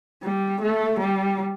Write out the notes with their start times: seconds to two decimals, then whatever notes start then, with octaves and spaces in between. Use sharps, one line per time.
0.23 G3
0.62 A3
1.00 G3